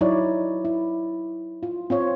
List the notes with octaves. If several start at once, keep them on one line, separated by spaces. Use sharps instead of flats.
F#3 D#4 E4 C#5 D5
E4
F4
C4 F4 C#5